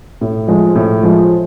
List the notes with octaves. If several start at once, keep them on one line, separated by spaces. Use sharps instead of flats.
A2
F3 G#3
A2
F3 G#3